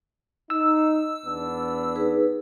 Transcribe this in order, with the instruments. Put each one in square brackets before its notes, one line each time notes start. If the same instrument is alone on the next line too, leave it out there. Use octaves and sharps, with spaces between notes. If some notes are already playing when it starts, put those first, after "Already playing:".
[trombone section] D#4 [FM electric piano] E6
[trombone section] E2 B3 D4
[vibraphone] D#4 G#4 B4